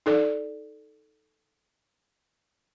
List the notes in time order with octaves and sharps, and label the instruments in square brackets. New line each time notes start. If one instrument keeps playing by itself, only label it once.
[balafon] D#4 A4 D5